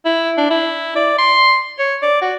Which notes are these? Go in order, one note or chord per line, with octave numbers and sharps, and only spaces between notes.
E4
D4
E4
D5
C6
C#5
D5
F#4